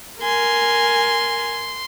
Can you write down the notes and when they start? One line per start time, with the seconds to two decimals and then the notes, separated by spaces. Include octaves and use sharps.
0.22 A#4 G#5 C6